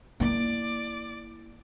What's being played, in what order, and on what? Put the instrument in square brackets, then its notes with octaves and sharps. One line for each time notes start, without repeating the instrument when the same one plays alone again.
[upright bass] A#3 E4 [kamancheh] D5 D6